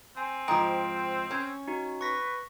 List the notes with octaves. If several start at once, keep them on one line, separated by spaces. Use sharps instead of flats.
C4 G#5
G#2 F3 G5
C#4
D#4 F#4
B4 C#6 A#6 B6